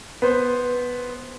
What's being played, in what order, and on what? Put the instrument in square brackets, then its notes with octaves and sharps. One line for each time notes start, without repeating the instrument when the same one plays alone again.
[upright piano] B3 C5